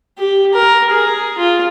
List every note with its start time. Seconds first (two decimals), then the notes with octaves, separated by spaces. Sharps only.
0.18 G4
0.53 A#4
0.91 G#4
1.38 F4